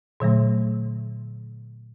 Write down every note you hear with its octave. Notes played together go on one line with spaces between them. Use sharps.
A#2 D3 F#3 A3